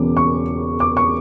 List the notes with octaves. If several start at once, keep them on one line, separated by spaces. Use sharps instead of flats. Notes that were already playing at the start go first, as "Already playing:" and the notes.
Already playing: E1 E2 C#3 D6
C#6
D6
C#6